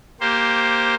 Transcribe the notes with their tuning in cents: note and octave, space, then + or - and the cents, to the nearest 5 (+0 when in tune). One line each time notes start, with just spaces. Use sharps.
A#3 +0 G4 -5 C5 +5